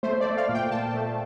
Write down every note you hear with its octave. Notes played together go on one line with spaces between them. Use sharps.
A3 C5
D5
A3
F5
A#2
G5
A#2 A5
A3